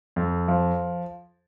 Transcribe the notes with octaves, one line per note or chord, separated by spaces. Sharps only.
F2
F3